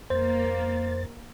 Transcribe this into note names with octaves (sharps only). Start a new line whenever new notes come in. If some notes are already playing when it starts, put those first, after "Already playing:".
F2 A#3 C5 A6